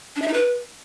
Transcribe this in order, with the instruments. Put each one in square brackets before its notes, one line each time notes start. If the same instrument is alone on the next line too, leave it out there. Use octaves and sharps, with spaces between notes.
[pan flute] D4
E5
D#4
B4